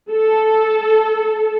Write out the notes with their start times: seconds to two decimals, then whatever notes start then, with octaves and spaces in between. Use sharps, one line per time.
0.10 A4